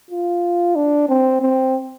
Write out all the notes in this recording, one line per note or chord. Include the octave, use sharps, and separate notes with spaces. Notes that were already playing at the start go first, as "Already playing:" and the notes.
F4
D4
C4
C4